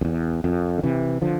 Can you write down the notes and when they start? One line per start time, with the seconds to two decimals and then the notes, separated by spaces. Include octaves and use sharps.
0.01 F2
0.05 E2
0.44 F2
0.78 D3
0.83 C3 E3
1.22 D3 F3